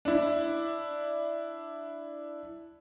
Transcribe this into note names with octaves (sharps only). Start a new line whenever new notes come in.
D4 E4